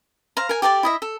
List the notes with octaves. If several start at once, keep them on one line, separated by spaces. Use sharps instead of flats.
C5 F5 A#5
A#4 G#5
G4 A4 D5 A5
E4 D#5 E5
A4